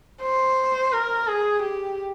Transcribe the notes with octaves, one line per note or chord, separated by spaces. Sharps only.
C5
A#4
G#4
G4